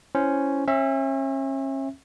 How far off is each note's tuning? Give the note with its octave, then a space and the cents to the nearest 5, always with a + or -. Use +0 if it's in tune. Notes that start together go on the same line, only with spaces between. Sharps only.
C#4 +0 E4 +0 C5 +0
C#4 -40 E5 +0